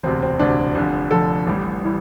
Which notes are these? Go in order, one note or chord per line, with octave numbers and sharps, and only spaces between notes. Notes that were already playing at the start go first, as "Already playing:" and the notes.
E1 D2 C3 C4
C4
E1 D2 C3 D4
F1 F2 D3
F1 F2 D3 A4
A1 A2 E3 G3
A2 E3 G3